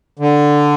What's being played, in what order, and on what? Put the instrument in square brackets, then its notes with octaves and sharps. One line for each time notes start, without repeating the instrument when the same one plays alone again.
[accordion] D3